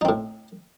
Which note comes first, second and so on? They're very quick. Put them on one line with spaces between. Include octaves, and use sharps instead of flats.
D#4 C4 A2